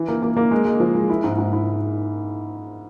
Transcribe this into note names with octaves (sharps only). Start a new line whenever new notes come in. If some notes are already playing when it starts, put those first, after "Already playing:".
Already playing: E3
A#3
A#3
A#3
G#3
G#3
F3
G#3
E4
G#2
G#2
E4